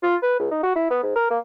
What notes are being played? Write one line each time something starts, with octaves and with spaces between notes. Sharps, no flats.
F4
B4
C#2
D#4
F#4
E4
B3
G#2
A#4
A#3